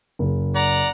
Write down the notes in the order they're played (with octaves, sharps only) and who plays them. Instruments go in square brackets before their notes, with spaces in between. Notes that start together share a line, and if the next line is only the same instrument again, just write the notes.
[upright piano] F#1
[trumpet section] D5 F#5 A#5